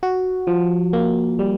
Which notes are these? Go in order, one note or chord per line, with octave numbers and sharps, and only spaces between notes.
F#4
F3
A#3
G3